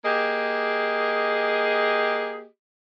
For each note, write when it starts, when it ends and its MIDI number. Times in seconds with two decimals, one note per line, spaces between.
0.04 2.45 58
0.04 2.45 67
0.04 2.45 68
0.04 2.45 75